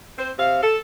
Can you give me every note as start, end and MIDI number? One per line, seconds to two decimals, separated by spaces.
0.17 0.31 60
0.17 0.31 72
0.38 0.59 48
0.38 0.59 77
0.62 0.77 69